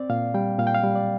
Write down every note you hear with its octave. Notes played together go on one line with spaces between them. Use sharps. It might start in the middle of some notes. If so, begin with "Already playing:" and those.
Already playing: C4 D5
A#2 F5
G3 G5
A#2 F5
G5
F5
G3
D5